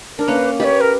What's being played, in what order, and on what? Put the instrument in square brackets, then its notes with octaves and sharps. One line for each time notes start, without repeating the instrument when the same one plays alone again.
[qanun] D4 [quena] A#4
[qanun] A#3 C#4 [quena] B4
[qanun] G4 B4 [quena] D#5
[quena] C#5
A#4